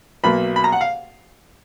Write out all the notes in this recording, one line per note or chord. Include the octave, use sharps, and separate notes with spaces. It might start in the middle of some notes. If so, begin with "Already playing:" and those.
B1 B2 A#3 B5
B5
A#5
F#5
F5